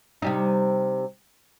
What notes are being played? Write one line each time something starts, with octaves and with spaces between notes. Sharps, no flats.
C3 G3 D#4